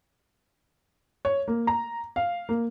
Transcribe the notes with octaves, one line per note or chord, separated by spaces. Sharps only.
C#5
A#3
A#5
F5
A#3